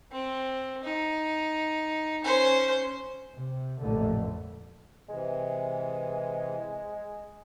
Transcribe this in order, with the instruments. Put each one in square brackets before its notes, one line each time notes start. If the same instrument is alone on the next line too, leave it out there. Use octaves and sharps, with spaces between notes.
[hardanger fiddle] C4
D#4
C#4 C5
[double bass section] C3
A1 F2 A#2 D3 A3
[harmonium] C3 E3 [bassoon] G#3